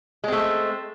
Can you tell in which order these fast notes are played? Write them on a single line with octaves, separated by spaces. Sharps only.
G#3 C4 A3